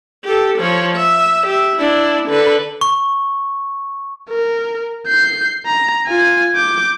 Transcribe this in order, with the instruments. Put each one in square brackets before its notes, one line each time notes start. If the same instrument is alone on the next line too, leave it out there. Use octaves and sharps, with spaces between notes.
[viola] G4 A4
F3 C#5
E5
G4 E5
D4 E4
D3 B4
[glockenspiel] C#6
[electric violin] A#4
G6 C7
A#5
F4 G#5
D6 G6